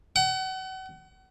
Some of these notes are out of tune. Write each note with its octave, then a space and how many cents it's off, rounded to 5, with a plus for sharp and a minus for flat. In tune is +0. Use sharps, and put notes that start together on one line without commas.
F#5 +35